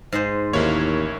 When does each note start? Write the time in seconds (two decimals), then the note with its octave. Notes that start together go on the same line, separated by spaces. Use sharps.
0.13 G#2 G#3 C5
0.53 A1 D#2 A#3 E4 C#5